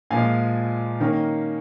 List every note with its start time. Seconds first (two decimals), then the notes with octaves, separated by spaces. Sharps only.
0.11 A#2 F3 G#3 F5 G#5
1.00 D#3 A#3 C#4